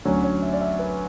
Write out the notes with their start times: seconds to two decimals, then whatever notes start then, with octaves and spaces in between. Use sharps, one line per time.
0.05 D2 D3 F#3 C#4
0.23 C#5
0.42 E5
0.53 D5
0.61 E5
0.79 B4